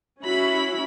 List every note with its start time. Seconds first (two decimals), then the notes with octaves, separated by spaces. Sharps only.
0.23 C#4 E4 F#4 B5